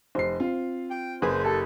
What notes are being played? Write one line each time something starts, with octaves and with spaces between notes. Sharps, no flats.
F1 C5 C7
C4 F4
G5
F#1 G#4 B4 C5
G4 A4 A5